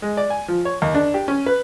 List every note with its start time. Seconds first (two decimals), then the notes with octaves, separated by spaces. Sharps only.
0.02 G#3
0.17 D5
0.30 G#5
0.48 F3
0.65 C#5
0.82 D#2
0.94 D4
1.14 G4
1.28 C#4
1.46 B4